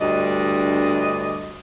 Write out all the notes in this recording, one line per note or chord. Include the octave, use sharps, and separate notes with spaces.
D2 G2 D5 D#5